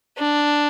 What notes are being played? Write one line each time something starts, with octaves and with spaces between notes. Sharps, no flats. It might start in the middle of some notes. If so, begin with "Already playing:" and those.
D4